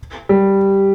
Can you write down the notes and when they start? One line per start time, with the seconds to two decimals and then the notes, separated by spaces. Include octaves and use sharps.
0.29 G3